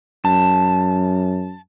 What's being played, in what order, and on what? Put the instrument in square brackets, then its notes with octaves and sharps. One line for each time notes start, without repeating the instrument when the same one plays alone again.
[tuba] F#2 [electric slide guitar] A5